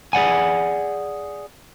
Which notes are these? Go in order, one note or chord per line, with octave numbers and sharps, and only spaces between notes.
G#4 D5 F#5 G#5